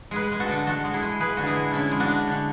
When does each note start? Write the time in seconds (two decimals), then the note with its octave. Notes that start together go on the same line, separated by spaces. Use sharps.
0.11 G#3 G#4 B4
0.32 G#3
0.40 F#4 A4
0.49 D3
0.66 G#3 F#4 A4
0.84 G#3
0.94 E4 G#4
1.03 G#3
1.20 G#3 G#4 B4
1.37 D3 F#4
1.47 E4 G#4
1.56 G#3
1.71 D3 C#4 E4
1.91 G#3
2.00 D4 F#4
2.09 G#3
2.27 D3